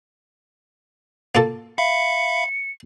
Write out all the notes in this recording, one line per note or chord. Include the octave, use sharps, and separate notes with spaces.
A#3 F4 A4
E5 F5 B5 C#7